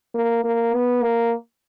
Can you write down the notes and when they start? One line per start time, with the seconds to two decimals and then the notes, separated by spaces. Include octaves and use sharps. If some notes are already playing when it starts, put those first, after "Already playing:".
0.15 A#3
0.44 A#3
0.73 B3
1.02 A#3